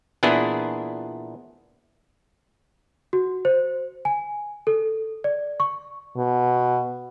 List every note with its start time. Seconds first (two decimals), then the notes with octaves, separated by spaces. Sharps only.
0.23 A#2 E3 B3 D4 E4 G#4
3.13 F#4
3.45 C5
4.05 G#5
4.67 A4
5.24 D5
5.60 C#6
6.17 B2